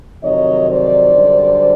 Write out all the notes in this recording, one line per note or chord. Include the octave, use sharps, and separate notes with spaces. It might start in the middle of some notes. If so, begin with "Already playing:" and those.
F2 C3 D#3 F#3 C#5 D#5
C5 D5
F#2 D3 G3